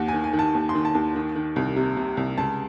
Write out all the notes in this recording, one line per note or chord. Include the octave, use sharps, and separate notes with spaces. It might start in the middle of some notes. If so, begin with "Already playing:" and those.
Already playing: D#2 F#5
G#5
D#3
G#5
D#3
A5
D#2
C6
D#3
A5
D#2
D#3
D#3
C2
C3
C3
C2
C#2 A5